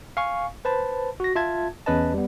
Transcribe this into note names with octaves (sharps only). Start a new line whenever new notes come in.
F5 G#5 C#6
B4 C5 A5 B5
F#4 A#6
F4 E5 A5 G#6
E2 C#4 B4 D#5 A5
G3 B3